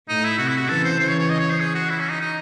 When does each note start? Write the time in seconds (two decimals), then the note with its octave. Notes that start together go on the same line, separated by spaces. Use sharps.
0.08 A2 D#4
0.24 E4
0.38 C3 F#4
0.48 E4
0.57 F#4
0.69 C#3 E3 A4
0.84 C5
0.99 C#3 E3 C5
1.09 C#5
1.19 C#5
1.29 D#5
1.40 C#5
1.50 C5
1.60 G#4
1.75 F#4
1.89 E4
2.00 C#4
2.10 D#4
2.21 D#4